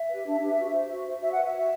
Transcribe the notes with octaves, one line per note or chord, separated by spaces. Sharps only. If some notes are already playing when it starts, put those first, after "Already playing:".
Already playing: E5
G4 B4
D4
G4 B4
F#4
C5
F#4
C5
F#4 E5
B4 F#5
E5
F#4